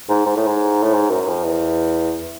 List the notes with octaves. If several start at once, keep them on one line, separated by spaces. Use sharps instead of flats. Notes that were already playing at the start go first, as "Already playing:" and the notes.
G#2
G#2
A2
G#2
A2
G#2
F#2
F2
E2